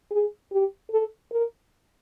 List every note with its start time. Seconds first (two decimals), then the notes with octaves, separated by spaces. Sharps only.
0.11 G#4
0.52 G4
0.91 A4
1.32 A#4